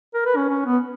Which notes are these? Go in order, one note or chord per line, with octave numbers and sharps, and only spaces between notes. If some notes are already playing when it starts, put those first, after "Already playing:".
A#4
B4
C#4
C#4
B3